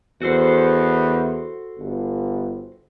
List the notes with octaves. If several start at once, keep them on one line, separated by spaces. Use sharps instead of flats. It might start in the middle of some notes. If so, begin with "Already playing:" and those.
E2 F#4 A4 C5
G1